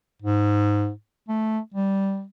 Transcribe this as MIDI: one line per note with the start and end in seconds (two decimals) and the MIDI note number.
0.22 0.91 44
1.28 1.59 57
1.75 2.24 55